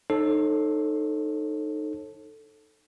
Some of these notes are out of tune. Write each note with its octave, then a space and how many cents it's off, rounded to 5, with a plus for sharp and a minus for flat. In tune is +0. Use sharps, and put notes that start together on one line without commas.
D#4 -20 A4 +0 C#5 -45